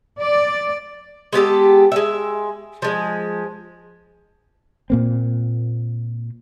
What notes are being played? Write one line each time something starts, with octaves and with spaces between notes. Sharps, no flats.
D5
G#3 B3 G4 A4
G#3 E5
F3 G#3
A#2 A#3 C4